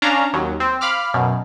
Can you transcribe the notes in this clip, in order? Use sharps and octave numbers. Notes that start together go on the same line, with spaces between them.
C#4 D4 F5 A#5
D#2 F#3
C4
F5 B5 D6 F6
F#2 B2